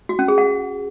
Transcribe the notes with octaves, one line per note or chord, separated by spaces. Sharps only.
F#4
C#4
G#4
F#5